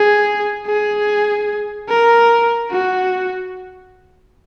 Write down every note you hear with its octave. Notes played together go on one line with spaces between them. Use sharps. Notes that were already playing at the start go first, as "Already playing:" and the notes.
Already playing: G#4
G#4
A#4
F#4